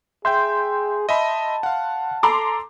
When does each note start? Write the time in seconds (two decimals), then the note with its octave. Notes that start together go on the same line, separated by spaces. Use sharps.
0.25 G#4 E5 G5 C6 G6
1.09 D#5 E5 A5 B5
1.63 F5 F#5
2.23 A4 A#5 C6 D6